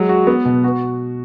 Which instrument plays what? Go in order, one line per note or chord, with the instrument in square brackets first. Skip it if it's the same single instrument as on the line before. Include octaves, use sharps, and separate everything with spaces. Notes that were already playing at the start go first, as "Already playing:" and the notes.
Already playing: [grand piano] F#3 G#3
F#4
B3
B2
F#4